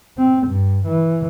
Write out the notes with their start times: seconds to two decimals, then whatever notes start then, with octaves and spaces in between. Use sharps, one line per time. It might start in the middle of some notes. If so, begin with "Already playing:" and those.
0.18 C4
0.47 G2
0.86 E3